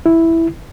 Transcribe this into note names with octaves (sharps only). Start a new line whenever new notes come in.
E4